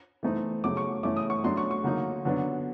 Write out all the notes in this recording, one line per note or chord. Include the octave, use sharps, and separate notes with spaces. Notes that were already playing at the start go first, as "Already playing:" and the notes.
E3 A3 C4 D#4
C#3 F#3 A3 D6
C#6
E3 A3 C#4 E4 D6
D#6
C#6
F#3 A3 D4 C6
C#6
C#6
D3 F#3 A#3 D#4
D3 F#3 B3 D4